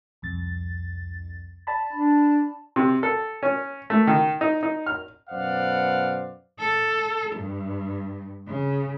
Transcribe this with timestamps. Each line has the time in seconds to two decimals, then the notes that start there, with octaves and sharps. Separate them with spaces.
0.22 C2 F2 A6
1.67 D5 A5 B5
1.93 D4
2.76 C3
3.03 A4
3.43 C#4
3.90 A3
4.07 D#3
4.41 D#4
4.63 D#4
4.86 F6
5.30 F#2 B2 C5 D5 F5 F#5
6.59 A4
7.35 G2
8.47 C#3